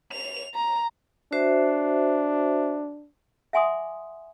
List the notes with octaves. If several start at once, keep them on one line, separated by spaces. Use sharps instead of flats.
F7
A#5
D4 F#4 C5 E5
E5 F#5 G#5 C6 D6 D#6